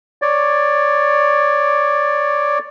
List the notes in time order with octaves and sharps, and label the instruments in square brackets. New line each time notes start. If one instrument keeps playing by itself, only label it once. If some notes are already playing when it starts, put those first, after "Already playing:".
[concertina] C#5 D5